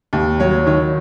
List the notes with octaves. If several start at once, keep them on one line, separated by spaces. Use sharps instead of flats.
D#2
F#3 C#5
D#3 C#5